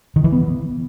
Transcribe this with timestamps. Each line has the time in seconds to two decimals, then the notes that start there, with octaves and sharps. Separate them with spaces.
0.16 D#3
0.24 E3
0.32 B3